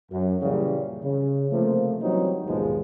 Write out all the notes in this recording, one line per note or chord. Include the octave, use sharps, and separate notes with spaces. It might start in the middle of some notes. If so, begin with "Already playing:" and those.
F#2
A#2 C#3 E3 G3
C#3
C3 F3 A3 A#3
E3 F#3 G3 C4 C#4 D#4
A#1 D#2 G#2 B2 F3 G#3